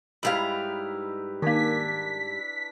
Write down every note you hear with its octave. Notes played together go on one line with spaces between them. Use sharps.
G#2 G3 D#4 E4 B4 F5 B5
D#3 A#3 D4 G#5 D6 B6